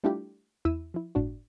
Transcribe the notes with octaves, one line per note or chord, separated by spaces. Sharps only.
G3 A3 D4 E4 F4 G4
E2 E4 E6 D#7
F3 E4
G1 A2 D4 F#4